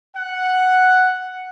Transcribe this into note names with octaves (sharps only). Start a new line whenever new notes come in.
F#5